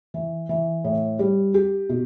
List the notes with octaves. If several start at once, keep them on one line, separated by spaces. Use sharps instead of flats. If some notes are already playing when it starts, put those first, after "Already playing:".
E3
E3
A2
G3
G4
B2